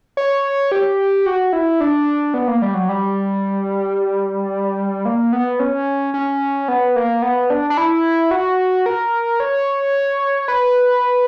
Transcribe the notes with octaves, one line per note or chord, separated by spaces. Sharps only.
C#5
G4
F#4
E4
D4
B3
A#3
G3
F#3
G3
A#3
B3
C#4
C#4
B3
A#3
B3
D4
D4
E4
F#4
A#4
C#5
B4